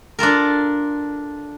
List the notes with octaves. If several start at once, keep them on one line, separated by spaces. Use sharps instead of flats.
D4 F4 A4 A#4